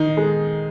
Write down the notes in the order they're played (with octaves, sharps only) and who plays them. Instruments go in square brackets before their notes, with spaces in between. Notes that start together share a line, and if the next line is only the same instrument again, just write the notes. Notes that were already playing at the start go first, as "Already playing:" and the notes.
Already playing: [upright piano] D#3 [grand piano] D#4
[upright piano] G#3